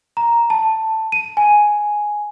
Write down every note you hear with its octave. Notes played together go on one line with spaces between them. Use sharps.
A#5
A5
D#7
G#5